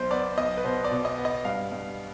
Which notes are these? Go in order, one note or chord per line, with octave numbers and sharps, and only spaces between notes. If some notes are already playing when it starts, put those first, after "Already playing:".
Already playing: B1 C5
B3 D5
B1 D#5
B4
B2 C5
D5
B2
D#5
B3
D#5
G2 F5
G2